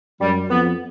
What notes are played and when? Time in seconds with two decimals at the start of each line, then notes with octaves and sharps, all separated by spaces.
0.21 F#2 G3
0.50 F2 B3